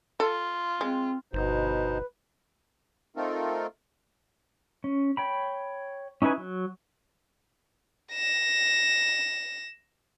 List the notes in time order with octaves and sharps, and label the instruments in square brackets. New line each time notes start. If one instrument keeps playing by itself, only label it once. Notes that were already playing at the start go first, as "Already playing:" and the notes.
[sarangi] F4 [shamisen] A4
[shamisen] G#3 [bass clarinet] C4
[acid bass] G1 [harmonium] B2 D#4 C5 [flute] B4
[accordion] A3 C4 D#4 F4 A4 A#4
[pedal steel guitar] C#4
C#5 G5 B5
C#4 D#4 E4 B4 G#5
F#3
[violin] A#6 E7